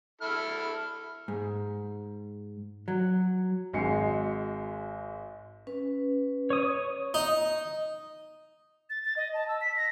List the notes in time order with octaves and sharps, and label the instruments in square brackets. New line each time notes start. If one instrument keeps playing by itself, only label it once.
[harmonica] E4 A4 F6
[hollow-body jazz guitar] G#2
F#3
[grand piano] G#1 G#3 F#4 G#5 C7 C#7
[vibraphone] C#4 B4
[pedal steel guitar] C#5 D#6
[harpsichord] D#4
[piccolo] A6
A6
D#5
A5
E6
B6
A#6